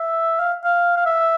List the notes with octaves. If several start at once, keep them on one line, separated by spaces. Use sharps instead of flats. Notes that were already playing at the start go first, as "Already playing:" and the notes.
Already playing: E5
F5
F5
F5
E5